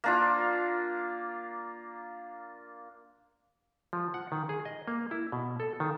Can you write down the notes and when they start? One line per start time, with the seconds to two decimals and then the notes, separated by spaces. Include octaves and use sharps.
0.04 A#3 D4 F4
3.93 F3
4.14 F#5
4.32 D#3
4.49 G#4
4.65 D#5
4.88 A#3
5.11 E4
5.32 B2
5.60 A4
5.80 D#3